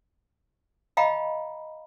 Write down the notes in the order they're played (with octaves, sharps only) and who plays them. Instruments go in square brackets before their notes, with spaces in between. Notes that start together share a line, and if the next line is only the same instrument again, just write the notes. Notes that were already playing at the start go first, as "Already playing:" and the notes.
[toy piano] D#5 F5 G5 A#5 B5